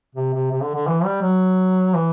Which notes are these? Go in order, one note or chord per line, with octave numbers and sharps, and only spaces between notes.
C3
C3
C3
D3
D3
E3
G3
F#3
E3